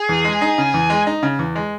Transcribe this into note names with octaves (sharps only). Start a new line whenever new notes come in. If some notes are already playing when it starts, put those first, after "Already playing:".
Already playing: G#4
E2
G#3
D#4
C#3
E2
G#3
D#4
C#3
E2
G#3